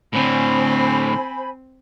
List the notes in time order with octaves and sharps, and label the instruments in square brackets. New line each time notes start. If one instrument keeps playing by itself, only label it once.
[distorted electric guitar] A2 D3 [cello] C4 [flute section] C5 G#5 B5